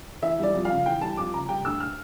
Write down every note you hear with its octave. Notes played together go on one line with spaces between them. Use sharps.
E3 E5
G3 D5
F2
F5
C#3
E3 G5
G3 A5
F2 D6
C#3 A#5
G3 G5
D2 E6
F6